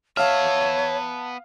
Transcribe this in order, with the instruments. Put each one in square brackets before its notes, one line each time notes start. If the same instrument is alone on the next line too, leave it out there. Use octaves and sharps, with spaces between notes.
[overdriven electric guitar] B3 E5 [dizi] C#5 [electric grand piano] F5 F6 [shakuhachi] A5